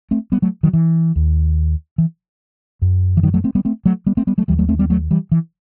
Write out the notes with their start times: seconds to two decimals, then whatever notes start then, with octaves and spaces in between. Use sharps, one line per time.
0.11 A3 C4
0.32 G3 B3
0.42 F#3 A3
0.63 D#3 F#3
0.73 E3
1.16 D#2
1.98 E3
2.82 F#2
3.17 E3
3.23 D#3 F#3
3.34 F#3 A3
3.44 A3 C4
3.55 G3 B3
3.65 A3 C4
3.86 F#3 A3
4.06 G3 B3
4.17 A3 C4
4.27 G3 B3
4.38 F#3 A3
4.48 D#2 E3 G3
4.59 F#3 A3
4.69 A3 C4
4.79 G3 B3
4.90 F#3 A3
5.11 E3 G3
5.32 E3